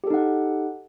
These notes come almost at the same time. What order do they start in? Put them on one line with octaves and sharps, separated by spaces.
G4 A4 D#4 F#5